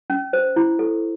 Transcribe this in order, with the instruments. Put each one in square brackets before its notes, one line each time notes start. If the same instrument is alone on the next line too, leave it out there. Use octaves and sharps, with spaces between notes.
[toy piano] C#4
C5
E4
A4